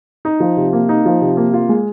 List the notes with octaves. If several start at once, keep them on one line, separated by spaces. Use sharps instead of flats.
D#4
F3
C3
A#3
D#4
F3
C3
A#3
F4
G#3